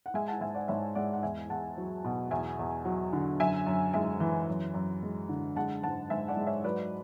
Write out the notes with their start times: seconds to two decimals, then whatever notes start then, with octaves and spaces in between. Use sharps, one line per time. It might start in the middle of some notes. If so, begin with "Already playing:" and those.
0.06 F#5
0.14 G#3 E5 G#5
0.28 F#5 A5
0.41 G#2 E5 G#5
0.55 D5 F#5
0.68 G#2 C#5 E5
0.95 G#3 D5 F#5
1.13 F#5
1.23 E2 E5 G#5
1.50 E2 F#5 A5
1.78 F#3
2.04 B2
2.31 E2 E5 G#5
2.59 E2
2.85 F#3
3.13 D3
3.40 F#2 E5 G#5
3.67 F#2
3.93 G#3 E5 G#5
4.20 E3
4.48 F#2
4.74 F#2
5.03 G#3
5.29 D3
5.56 G#3 F#5 A5
5.83 G#2 F#5 A5
6.10 G#2 E5 G#5
6.28 D5 F#5
6.37 G#3
6.47 C#5 E5
6.64 F#3 B4 D5